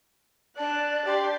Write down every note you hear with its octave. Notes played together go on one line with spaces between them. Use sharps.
D4 D5 A5 F#6
G4 D5 C6